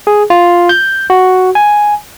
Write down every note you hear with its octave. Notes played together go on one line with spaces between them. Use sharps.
G#4
F4
G6
F#4
G#5